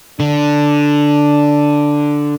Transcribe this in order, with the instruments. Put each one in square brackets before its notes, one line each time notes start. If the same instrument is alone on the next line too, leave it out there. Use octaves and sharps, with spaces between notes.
[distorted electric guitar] D3 [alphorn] D4